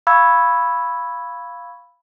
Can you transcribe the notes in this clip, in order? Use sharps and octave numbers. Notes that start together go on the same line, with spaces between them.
F5 B5 C#6 E6 G#6